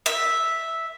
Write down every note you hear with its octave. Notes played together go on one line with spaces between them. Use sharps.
E5